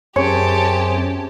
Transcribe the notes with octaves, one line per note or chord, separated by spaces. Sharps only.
F#2 C4 G4 G#4 C#5 A5